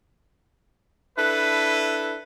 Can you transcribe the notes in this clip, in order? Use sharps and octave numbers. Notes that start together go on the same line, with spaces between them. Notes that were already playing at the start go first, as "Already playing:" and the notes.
D4 E4 A4 B4